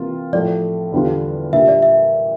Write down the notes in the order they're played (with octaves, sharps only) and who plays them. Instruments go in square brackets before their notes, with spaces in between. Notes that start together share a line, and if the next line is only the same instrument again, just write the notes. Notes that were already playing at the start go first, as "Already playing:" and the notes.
Already playing: [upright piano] C3 E3 A#3 F4
[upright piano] A2 F3 A3 [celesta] D5
[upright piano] E2 D3 G3 D4 F4
[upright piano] A#2 G3 D4 G4 [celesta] E5
[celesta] D5
E5